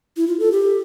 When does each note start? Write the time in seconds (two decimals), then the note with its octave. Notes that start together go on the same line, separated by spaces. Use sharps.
0.17 E4
0.28 F4
0.40 A4
0.52 G4